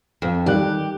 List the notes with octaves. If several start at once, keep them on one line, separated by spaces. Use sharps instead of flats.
F2
D#3 G3 G4 F#6